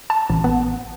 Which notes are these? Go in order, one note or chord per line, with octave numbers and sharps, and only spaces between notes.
A5
A1
B3